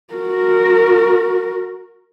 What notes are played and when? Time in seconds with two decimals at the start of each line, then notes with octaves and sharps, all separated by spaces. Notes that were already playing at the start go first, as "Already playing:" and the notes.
0.14 F#4 A#4